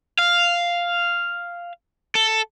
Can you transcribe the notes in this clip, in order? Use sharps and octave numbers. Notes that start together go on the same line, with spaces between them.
F5
A4